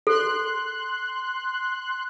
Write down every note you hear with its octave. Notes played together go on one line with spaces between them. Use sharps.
A4 C6 F#6